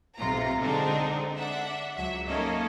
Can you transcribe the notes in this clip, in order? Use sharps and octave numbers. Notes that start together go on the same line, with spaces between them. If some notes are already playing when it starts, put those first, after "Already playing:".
B1 C3 F4 A#5
D3 G#3 C4 D4 D#4
D4 E5 F#5
C#2 F#3 E5
A#3 C#4 D#4 A4 D#5